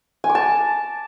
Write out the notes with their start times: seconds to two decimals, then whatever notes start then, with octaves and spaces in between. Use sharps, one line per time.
0.24 G#5
0.29 D6
0.35 A5